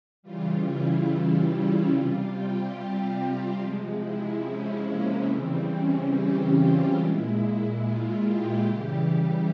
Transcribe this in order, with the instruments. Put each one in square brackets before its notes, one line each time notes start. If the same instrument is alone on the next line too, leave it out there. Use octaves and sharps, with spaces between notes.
[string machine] C#3 E3 G3 F4
E4
F4
C#4
C3 G3 F4
G4
C4
C3 F3 G#3
E4
C#4
A#3
C#3 E3 G3 C4
C#4
G4
F4
A#2 G#3 E4
F4
G4
C#3 E3 G3
G4